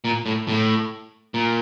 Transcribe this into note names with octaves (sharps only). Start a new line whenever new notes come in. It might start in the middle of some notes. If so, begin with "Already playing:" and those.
A#2
A2
A2
A#2